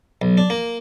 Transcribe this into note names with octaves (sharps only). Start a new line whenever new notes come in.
B1
D4
A#3